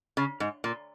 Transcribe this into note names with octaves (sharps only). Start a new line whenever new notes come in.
C#3
G#2
A#2